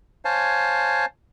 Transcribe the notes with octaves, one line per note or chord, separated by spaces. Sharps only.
C5 C#5 F5 G#5 A5